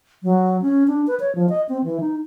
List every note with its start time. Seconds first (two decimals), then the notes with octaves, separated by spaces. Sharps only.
0.23 F#3
0.62 C#4
0.88 D4
1.07 B4
1.20 C#5
1.35 F3
1.49 D#5
1.69 C4
1.84 E3
2.00 D#4